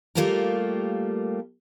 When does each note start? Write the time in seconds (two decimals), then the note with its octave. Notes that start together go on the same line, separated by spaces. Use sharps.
0.15 G3 A3 A#3 F4 G4 A#4